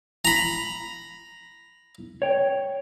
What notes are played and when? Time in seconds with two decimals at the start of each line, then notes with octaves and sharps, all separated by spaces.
0.25 A#5 B5
2.22 C#5 G5